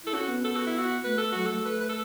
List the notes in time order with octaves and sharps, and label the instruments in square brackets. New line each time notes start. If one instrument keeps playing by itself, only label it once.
[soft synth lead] E4 [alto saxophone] A4
[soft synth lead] C#4 [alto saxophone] F#4
[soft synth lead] B3
[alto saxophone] A4
F#4
E4
F#4
[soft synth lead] A3 [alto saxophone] B4
[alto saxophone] A4
[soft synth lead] F#3 [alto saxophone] F#4
[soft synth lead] A3 [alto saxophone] A4
[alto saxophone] B4
B4
A4